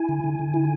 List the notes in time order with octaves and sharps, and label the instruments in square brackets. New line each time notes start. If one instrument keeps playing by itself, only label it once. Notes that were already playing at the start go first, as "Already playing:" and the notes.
Already playing: [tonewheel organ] E4 G#5
D3
D3
D3
E4